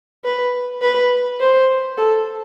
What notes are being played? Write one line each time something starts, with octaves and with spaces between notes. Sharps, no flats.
B4
B4
C5
A4